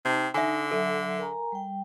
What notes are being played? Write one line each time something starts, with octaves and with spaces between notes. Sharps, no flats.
C3 D#4 G5 A5
D3 D#4 E5 G#5
F#3 A4 E5
A#4 G#5 A#5
G3 G5